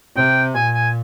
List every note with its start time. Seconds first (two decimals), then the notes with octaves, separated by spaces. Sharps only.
0.16 C3 G5
0.55 A#2 G#5
0.75 G#5